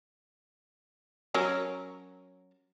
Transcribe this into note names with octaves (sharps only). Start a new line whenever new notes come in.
F#3 C#4 A#4